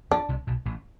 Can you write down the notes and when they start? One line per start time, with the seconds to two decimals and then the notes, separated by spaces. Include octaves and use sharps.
0.11 F2 F3 D4
0.29 C2 C3
0.47 B1 B2
0.66 A1 A2